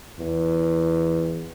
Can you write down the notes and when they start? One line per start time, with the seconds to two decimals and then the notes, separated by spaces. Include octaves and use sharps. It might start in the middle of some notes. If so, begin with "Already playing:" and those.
0.19 E2